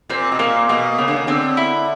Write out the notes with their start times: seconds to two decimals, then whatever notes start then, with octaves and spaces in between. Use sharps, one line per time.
0.09 A#2 C4
0.32 B2
0.39 A#2 A#3
0.69 B2 A#3
0.98 C#3 A#3
1.08 D3
1.16 C#3
1.27 D3 C4
1.57 E4